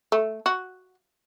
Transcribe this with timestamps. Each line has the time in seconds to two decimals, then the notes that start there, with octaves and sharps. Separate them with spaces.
0.12 A3
0.46 F#4